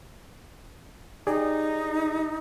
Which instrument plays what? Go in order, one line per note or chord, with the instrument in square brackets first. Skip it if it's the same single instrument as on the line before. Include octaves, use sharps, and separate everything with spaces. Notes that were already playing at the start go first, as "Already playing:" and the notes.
[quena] D#4 [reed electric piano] G4 G#4 D5